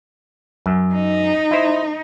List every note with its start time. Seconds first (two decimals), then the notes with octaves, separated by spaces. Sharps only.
0.66 F#2
0.95 D#4
1.51 E4 C5